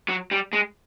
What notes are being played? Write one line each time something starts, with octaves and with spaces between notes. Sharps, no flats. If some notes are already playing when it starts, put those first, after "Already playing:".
F#3
G3
G#3